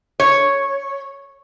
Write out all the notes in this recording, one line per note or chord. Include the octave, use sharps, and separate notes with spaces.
C#5